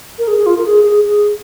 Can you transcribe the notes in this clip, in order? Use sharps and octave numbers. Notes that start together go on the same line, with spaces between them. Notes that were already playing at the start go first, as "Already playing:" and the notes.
A#4
G#4
G#4
F4
A#4
G#4
G#4
G#4